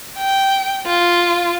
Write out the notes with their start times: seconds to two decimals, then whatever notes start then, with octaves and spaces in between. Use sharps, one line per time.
0.18 G5
0.87 F4